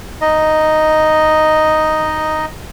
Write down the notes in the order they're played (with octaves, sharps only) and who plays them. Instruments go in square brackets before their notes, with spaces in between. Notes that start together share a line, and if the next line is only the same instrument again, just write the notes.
[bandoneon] D#4 D#5